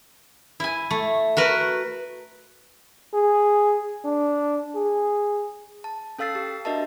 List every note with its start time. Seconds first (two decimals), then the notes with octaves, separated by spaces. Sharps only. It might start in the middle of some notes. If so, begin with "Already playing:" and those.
0.60 E4 G#5
0.91 A3
1.37 F#4 A#4 B4
3.14 G#4
4.04 D4
4.75 G#4
5.84 A5
6.18 C#4 A4 F5 E6 A6 C7
6.35 G4
6.65 D4 F#4 A#4 D#5 E5 A5